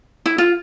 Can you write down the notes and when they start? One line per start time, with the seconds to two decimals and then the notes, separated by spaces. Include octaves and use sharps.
0.26 E4
0.38 F4